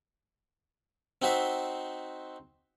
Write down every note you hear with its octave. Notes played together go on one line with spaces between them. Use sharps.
C4 D#4 F#4 C5 E5